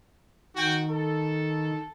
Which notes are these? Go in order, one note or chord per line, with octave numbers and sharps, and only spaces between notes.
D#3 F#4 G5
A4